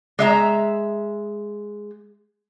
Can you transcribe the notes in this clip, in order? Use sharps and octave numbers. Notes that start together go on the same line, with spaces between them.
G#3 E5 A#5